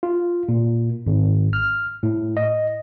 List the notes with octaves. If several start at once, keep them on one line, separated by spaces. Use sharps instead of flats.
F4
A#2
G#1
F6
A2
D#5